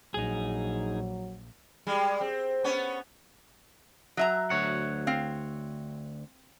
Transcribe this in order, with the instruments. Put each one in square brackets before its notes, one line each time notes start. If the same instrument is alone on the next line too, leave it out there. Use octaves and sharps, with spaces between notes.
[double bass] A#1 [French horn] F#3 [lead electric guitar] D#4 G#4
[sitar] G3 G#3
C4
B3 C#4
[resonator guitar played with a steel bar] F#3 E5 A#5
[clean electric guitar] D2 C#5 F#5
[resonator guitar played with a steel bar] C4 F5